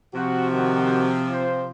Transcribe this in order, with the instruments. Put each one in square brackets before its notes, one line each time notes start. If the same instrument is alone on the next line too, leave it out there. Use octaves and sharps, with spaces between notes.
[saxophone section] C3 F3 [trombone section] F#4
[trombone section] D#3 F#4
F4 C5